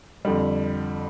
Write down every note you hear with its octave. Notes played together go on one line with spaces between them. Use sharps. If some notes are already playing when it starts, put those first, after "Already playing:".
F2 D3 G3